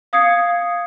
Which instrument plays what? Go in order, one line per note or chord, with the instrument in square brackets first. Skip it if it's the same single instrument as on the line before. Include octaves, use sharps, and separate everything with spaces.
[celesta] F5 D#6 G#6 C7 C#7